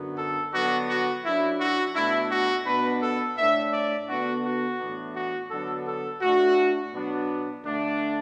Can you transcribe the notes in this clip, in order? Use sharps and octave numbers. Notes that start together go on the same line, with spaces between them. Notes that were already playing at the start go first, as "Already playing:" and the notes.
Already playing: F#2 D3 F#3 B3
A4
D3 F#3 B3 D4 F#4
F#4
F#2 F#3 D4 E4
F#4
B2 A3 D4 E4
F#4
B2 B3 D4 B4
A4
A2 A3 D4 E5
D5
D3 B3 D4 F#4
F#4
A2 E3 B3 D4
F#4
D3 F#3 B3 D4 A4
A4
A2 A3 D4 F#4
B2 F#3 B3 D4
D3 A3 D4